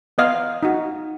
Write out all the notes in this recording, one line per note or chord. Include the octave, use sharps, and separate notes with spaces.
B3 D#5 F5
D#4 F#4